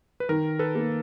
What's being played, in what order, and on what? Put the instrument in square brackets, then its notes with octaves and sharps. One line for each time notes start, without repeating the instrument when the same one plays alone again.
[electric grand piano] B4
[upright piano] D#3 [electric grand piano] A#4
[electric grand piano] A4 B4
[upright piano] A#3